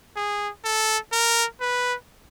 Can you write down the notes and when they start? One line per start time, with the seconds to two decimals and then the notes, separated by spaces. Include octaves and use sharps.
0.16 G#4
0.64 A4
1.12 A#4
1.61 B4